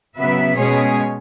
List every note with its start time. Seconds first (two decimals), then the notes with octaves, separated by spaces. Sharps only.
0.16 C#3 F#3 B3 B4 E5
0.56 B2 G#3 C#4 G#4 C#5